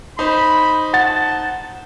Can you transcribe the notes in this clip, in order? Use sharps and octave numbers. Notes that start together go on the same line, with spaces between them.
D#4 C5 B5
F#5 A5 A6